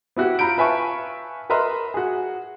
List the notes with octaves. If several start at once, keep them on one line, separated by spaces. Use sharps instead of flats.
B3 E4 F#4 G4
F4 A#5 B5 G6 D7
F4 B4 E5 G#5 A5 C#6
A#4 B4 D#5 E5 A#5 C6
F#4 G#4